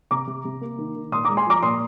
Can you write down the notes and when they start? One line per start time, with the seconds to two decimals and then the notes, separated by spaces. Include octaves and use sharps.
0.11 C3 A#5 D6
0.27 C3
0.45 C3
0.61 A#3
0.78 D#3
0.95 D#3
1.12 A#2 C6 D#6
1.25 G#3 A#5 D6
1.37 G#5 C6
1.47 F3 A#5 D6
1.63 A#2 C6 D#6